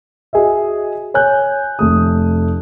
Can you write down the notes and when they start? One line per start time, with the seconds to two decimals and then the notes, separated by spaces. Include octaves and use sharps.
0.33 F#4 G#4 D#5 E5
1.14 C#5 G#5 F#6 G6
1.79 F1 A3 D#6